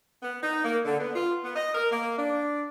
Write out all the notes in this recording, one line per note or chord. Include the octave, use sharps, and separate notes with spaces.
B3
D#4
A#3
D3
B3
F4
B3
D#5
A#4
A#3
D4